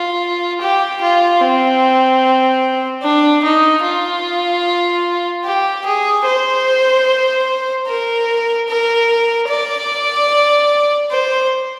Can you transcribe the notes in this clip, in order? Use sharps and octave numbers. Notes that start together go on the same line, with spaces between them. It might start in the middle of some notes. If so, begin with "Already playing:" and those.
Already playing: F4
G4
F4
C4
D4
D#4
F4
G4
G#4
C5
A#4
A#4
D5
C5